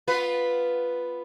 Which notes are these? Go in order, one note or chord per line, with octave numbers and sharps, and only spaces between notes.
B3 F4 B4